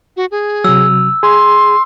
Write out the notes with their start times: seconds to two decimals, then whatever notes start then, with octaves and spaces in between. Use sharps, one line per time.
0.17 F#4
0.31 G#4
0.64 C3 F#3 E6
1.23 G#4 C6